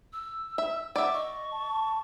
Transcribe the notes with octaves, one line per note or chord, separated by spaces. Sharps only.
E6
E5
D5 E5 F#5 D6
D#5 C#6
A5